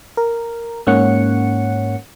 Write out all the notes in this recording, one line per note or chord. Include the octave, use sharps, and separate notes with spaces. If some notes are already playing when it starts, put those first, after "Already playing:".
A#4
G#2 A#3 C#4 C#5 F#5 C#7